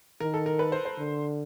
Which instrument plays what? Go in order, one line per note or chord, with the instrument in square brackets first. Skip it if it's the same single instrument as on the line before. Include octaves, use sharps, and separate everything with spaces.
[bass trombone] D#3 [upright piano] A#4
[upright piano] A4
A#4
B4
C5
C5
[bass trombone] D3